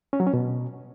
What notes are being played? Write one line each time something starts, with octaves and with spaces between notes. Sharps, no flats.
C#4
F#3
C#4
B2